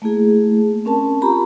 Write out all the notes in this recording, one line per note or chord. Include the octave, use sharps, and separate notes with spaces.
A3 A#3 E4 G#4
C4 C#4 A#4 A5
F4 G4 A#5 B5 C#6